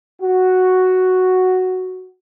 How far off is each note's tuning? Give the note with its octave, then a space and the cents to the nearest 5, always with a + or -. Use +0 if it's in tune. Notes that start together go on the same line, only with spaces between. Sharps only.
F#4 +0